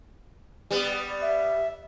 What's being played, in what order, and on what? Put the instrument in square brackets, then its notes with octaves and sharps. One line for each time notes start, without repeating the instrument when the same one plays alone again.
[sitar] G3 B3
[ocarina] E5